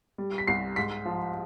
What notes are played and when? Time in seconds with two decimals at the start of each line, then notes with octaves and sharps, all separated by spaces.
0.18 G3
0.38 B6
0.47 C2 C7
0.76 G#2 B6
1.05 F3